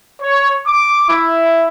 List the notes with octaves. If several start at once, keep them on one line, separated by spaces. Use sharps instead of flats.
C#5
D6
E4